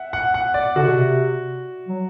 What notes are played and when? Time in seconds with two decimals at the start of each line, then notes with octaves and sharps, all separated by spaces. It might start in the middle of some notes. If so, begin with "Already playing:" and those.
Already playing: E5 F#5
0.13 F#5
0.34 F#5
0.54 D5
0.76 D3 F#4
0.83 C3
0.89 B2
0.96 C3
1.88 F#3